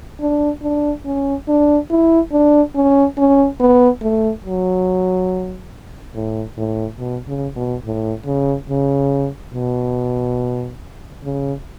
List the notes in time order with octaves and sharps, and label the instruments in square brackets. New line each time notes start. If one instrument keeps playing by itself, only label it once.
[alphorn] D4
D4
C#4
D4
E4
D4
C#4
C#4
B3
A3
F#3
A2
A2
B2
C#3
B2
A2
C#3
C#3
B2
C#3